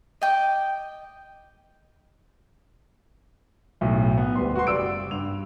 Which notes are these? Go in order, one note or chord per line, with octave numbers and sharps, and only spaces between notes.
D#5 G5 D6
B1 A2
B3
D1 G3 B3 B4 C6
F#4 C6
F#1 G3 D5 E6 D7
G2 F7